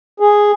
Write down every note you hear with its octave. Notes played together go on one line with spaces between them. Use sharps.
G#4